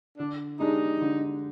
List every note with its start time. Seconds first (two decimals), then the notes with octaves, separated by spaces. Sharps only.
0.18 D3 D4
0.60 G#3 D4 D#4 G4
1.01 D3